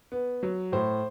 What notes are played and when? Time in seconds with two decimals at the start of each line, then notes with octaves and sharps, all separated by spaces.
0.12 B3
0.43 F#3
0.72 A2 C5